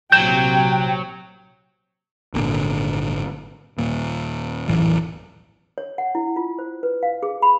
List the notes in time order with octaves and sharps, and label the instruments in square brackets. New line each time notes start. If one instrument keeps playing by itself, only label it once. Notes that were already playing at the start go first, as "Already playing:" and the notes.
[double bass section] A#1 C3 [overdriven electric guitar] F#3 [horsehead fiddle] G5 [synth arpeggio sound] G6 E7
[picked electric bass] G#1 G2 A#2 D3
D#2 A#2
D#1 A1 F#2 E3
[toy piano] C#5
F#5
E4
F4
C5
B4
F5
G#4
B5